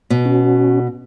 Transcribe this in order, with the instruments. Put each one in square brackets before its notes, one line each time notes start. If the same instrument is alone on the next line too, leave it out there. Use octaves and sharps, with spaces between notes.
[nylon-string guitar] B2
[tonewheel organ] C#4 F#4